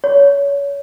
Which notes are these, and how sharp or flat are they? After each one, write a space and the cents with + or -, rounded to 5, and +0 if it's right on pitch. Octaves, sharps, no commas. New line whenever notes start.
C#5 +30